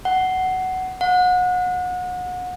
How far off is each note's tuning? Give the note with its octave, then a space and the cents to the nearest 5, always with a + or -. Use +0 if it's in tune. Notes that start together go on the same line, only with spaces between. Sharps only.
F#5 +10
F#5 -30